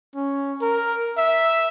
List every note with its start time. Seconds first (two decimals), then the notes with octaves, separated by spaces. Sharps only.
0.15 C#4
0.62 A#4
1.17 E5